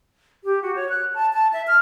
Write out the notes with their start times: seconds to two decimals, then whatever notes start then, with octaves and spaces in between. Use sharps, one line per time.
0.44 G4
0.62 F#4
0.76 C#5
0.89 F#6
1.14 A5
1.33 A5
1.53 E5
1.67 F6